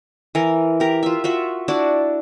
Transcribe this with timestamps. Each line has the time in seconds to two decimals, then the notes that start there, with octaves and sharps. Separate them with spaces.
0.35 E3 A#4
0.80 G4 A#4
1.03 F4 E5
1.24 F4 F#4 E5
1.68 D4 E4 F#4 D5